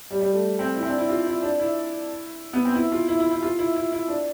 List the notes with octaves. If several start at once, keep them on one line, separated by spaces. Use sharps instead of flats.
G3
G3
A3
C4
E4
C4
D4
E4
F4
E4
D4
E4
B3
C4
E4
F4
E4
E4
E4
F4
E4
E4
E4
D4